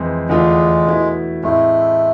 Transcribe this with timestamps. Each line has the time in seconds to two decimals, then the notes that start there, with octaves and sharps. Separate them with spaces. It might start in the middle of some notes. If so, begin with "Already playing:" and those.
Already playing: F2 E3 G#3 C4 E4
0.29 E2 D3 G#3 A3 D4 F4
0.86 B2 A3 E4
1.43 A2 G#3 A3 C4 E4